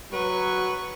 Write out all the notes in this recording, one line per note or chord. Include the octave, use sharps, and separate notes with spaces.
F#3 B4 C#6